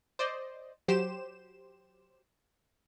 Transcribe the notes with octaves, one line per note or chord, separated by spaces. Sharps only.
C5 D5 D#5
F#3 G4 C5 E7